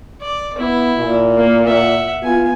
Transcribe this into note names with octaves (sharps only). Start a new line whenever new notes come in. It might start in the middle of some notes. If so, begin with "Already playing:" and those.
D5
B3 E4
A#2
A#3
E5 F#5
B3 F4 G#5